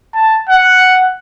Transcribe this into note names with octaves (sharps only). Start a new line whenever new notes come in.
A5
F#5